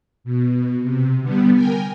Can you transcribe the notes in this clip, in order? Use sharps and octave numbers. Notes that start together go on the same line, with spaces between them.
B2
C3
D3 G3 B3
A#4 G5 G#5